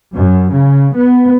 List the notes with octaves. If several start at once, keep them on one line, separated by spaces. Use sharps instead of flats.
F#2
C#3
B3